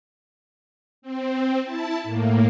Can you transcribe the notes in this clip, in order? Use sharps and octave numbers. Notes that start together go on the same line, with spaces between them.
C4
E4 A5
A2 A#3